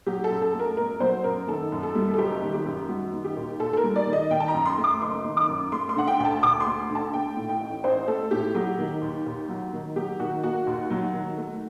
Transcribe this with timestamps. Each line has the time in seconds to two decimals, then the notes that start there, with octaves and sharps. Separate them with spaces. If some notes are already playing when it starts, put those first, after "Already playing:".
0.07 F#3 G4
0.24 A4
0.30 F#2
0.42 A4
0.54 A3
0.59 A#4
0.77 G1 A#4
1.00 F#3 C5
1.24 F#2 A#4
1.48 D#3 A4
1.72 F#2
1.83 A4
1.95 G3
2.14 A4
2.18 F#1 G4
2.42 D#3
2.53 G4
2.66 F#2
2.89 G3 F#4
3.13 D#3
3.24 G4
3.37 D#2
3.60 D#2 A4
3.73 A4
3.77 A#4
3.84 G3
3.96 D5
4.07 D#3
4.13 D#5
4.31 D#3 G5
4.40 A5
4.48 A#5
4.54 F#2
4.65 C6
4.78 A3
4.84 D6
5.02 F#1 C6
5.25 D#3
5.37 D6
5.48 F#2
5.72 A3 C6
5.89 C6
5.96 D3 F#5
6.07 G5
6.20 D2 G5
6.25 A5
6.43 D2 D6
6.60 C6
6.66 A3
6.90 D3
6.95 A5
7.14 A3 G5
7.37 A2
7.49 G5
7.61 A1
7.84 A1 C5
8.08 A3 A4
8.31 A2 G4
8.55 F#3 G4
8.78 D#3
9.01 D#2
9.26 D#2
9.49 F#3
9.73 D#3
9.96 F#3 G4
10.20 D#3 F#4
10.43 A#3 F#4
10.67 D#2
10.90 F#3
11.13 D#3
11.37 A3